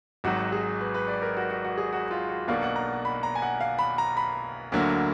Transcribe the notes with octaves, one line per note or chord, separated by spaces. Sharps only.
G#1 G#2 F#3 F#4
G#4
B4
B4
D5
A#4
F#4
F#4
F#4
G#4
F#4
F4
F#4
B1 B2 A#3 D4 F5
F#5
A#5
B5
A#5
G#5
F#5
F5
B5
A#5
B5
D2 D3 F#3 A#3